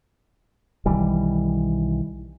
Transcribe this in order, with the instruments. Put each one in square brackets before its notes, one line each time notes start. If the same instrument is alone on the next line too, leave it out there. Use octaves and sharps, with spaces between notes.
[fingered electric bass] B1 D#3 E3 G3